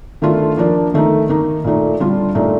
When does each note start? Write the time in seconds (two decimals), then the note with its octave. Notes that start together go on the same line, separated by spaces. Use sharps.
0.22 D#3 A3 D4 F4
0.57 F3 A#3 D4
0.94 D#3 A3 D#4
1.29 D#3 A#3 D#4
1.64 A#2 A3 D#4
2.00 D3 G3 D4 F4
2.35 A#2 A3 D#4